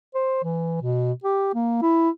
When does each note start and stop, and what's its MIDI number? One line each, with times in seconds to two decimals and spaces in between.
0.14 0.41 72
0.43 0.77 52
0.82 1.12 47
1.24 1.50 67
1.54 1.80 58
1.82 2.10 64